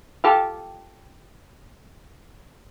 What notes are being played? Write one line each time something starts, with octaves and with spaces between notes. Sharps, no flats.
F4 G4 A4